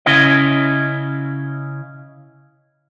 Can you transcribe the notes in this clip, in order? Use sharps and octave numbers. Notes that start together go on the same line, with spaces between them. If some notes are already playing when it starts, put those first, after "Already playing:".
C#3 C#4 E4 D#5